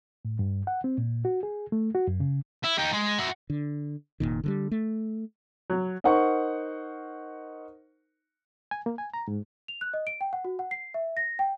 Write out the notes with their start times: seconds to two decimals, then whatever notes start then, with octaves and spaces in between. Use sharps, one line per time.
0.25 A2
0.39 G2
0.67 F#5
0.84 C4
0.98 A#2
1.25 F#4
1.43 G#4
1.72 A3
1.95 F#4
2.08 F#2
2.20 C#3
2.64 E4
2.78 D#4 G4
2.92 G#3
3.19 F#4 E5
3.50 D3
4.20 F1 A#1 A#2 D#3
4.44 D3 F3 G3
4.71 A3
5.70 F#3
6.04 D#4 A#4 C5 F#5 C#6
8.71 G#5
8.86 A#3
8.98 G#5
9.14 A#5
9.28 G#2
9.68 F7
9.81 F#6
9.94 D#5
10.07 D7
10.21 G5
10.33 F#5
10.45 F#4
10.59 F#5
10.71 C7
10.94 E5
11.17 A#6
11.39 G5